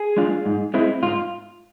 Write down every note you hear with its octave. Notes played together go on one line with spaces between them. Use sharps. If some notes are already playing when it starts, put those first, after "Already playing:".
Already playing: G#4
G#3 D4 F4
G#2
G#3 C4 E4
G#2 F4